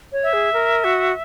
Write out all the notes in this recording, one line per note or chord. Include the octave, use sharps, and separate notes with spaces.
C#5
E5
G#4
A#4
F#4